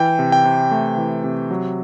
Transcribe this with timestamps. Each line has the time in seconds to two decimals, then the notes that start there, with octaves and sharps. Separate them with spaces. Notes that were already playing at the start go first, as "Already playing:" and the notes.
Already playing: E3 G5
0.19 C3
0.32 G5
0.45 C3
0.71 A3
0.98 E3
1.24 C3
1.51 F#3